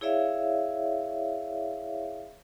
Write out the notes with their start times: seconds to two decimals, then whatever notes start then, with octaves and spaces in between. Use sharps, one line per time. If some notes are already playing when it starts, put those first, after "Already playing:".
0.01 E4 G#4 C#5 D5 E5 F5